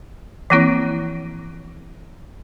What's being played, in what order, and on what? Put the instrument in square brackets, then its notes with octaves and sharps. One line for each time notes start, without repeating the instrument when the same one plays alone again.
[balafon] E3 F3 A#3 C4 E4